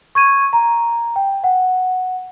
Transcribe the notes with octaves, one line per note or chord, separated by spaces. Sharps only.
C#6 G#6 D#7
A#5
G5
F#5